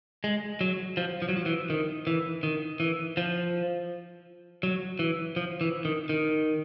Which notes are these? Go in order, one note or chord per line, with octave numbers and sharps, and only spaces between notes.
G#3
F#3
F3
F3
F#3
F3
E3
D#3
E3
D#3
E3
F3
F#3
E3
F3
E3
D#3
D#3